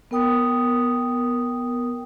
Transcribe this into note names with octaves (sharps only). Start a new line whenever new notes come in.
B3 A#4 G5 D#6